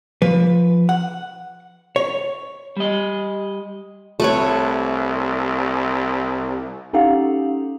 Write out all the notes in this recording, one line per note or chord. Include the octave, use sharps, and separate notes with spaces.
F3 B4
F#5
C#5
G3 D#5
C2 A3 B4 C#5
C#4 D#4 G4 A4 F5 F#5